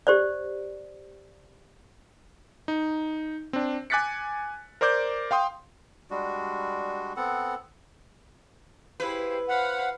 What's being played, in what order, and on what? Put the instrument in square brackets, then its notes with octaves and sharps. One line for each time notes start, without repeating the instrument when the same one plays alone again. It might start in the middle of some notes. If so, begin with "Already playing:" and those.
[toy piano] G4 C5 D5
[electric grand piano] D#4
C4 D4
G#5 D6 F#6 A6 B6 C#7
A#4 C5 D5 D6 G6
F5 G5 C6 D#6
[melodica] G3 G#3 D4 F#4
B3 C4 A4 F#5
[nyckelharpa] E4 G#4 [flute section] G4 C5 F5 [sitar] B4
[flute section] C5 [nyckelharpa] F5 B5 [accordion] F#5